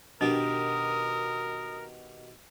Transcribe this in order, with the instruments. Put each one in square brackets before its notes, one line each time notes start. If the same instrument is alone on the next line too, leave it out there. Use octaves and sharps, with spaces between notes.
[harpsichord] B2 D#3 G4 [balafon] D4 [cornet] A#4 [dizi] D#6